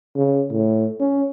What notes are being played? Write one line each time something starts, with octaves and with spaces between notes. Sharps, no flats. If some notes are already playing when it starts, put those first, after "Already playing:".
C#3
A2
C#4